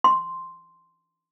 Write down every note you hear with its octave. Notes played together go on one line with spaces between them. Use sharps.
C6